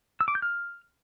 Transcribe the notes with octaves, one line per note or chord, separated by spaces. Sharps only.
E6
D6
G6
F6